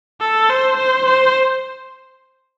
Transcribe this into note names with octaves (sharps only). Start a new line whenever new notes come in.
A4
C5
C5
C5